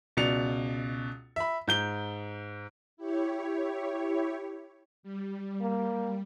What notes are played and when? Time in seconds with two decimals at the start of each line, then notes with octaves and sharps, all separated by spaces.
0.17 C#2 B2 D5 C#7 F7
1.36 E5 B5
1.68 G#2 G6 G7
2.97 E4 G4 C#5
5.03 G3
5.61 A#3